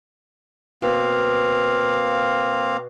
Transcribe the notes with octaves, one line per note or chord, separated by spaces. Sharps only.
B2 A#3 C4 F5